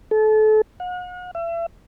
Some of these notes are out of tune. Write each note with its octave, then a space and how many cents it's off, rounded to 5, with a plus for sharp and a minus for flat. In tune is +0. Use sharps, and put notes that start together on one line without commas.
A4 -30
F#5 -40
E5 +35